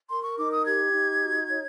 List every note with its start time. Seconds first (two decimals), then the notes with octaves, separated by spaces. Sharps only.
0.09 A#4 C6
0.23 C#6
0.37 D#4 D6
0.51 D#6
0.65 G4 G#6
0.93 D#4
1.22 F#4
1.50 C#5